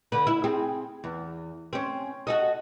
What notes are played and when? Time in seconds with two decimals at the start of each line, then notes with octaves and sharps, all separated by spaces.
0.12 D3 B4
0.27 E4
0.44 C4 G#4
1.04 E2
1.73 C4 C#4
2.27 F#4 A4 D#5